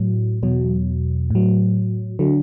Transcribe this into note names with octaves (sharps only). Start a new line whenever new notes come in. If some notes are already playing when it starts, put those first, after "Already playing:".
Already playing: A2 F#3
E2 B2 F#3
A2 F#3
D3 F#3